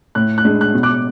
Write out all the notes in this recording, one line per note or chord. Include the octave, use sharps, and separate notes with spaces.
A2 F#6
F#6
G#3 D4
F#6
B2
D6 F#6